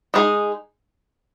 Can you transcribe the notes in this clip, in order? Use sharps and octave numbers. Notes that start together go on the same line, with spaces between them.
G#3 D#4 G#4